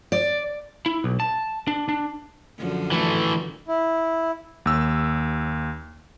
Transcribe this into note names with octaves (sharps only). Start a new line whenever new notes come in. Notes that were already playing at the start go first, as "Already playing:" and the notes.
D5
E4
B1
A5
D4
D4
F#2 D3 F3
E3 A3
E4
D#2 E6